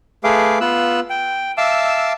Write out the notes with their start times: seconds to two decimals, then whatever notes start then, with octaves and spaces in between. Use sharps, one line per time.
0.24 A3 G#4 B4 F5 D6
0.61 B3 F4 E6 F#6
1.10 G5
1.58 E5 F5 A5 D6 E6